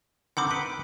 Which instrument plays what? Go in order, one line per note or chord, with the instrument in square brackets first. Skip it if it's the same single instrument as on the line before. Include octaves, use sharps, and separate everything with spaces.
[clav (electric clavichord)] D3 D#3 C4 [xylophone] F#5 B5 D6
[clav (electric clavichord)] B4 F#5 G5 [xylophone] B6